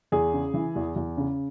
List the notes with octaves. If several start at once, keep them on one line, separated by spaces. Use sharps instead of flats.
E2 G#4
C#3
E3
E2
E2
C#3